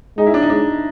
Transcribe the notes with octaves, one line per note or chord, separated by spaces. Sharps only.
G#3 D#4
E4
D4
D#4
G#3 D4